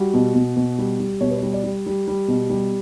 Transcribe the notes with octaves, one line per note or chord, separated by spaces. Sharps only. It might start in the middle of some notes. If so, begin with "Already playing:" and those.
Already playing: G3 F#4
B2
B2
B2
G3
G3
B2 C#5
B4
C#5
G3
D5
G3
G3
G3
B2
G3